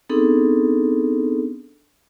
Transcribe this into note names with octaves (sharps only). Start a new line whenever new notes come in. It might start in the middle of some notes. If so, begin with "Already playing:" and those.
B3 C4 D4 D#4 G#4 A4